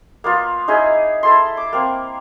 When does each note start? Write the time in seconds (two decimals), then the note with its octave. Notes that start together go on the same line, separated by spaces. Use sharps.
0.24 A#3 B3 F4
0.68 D#4 E4 G#4 D#5
1.23 E4 A4 C6
1.57 D6
1.73 A#3 C4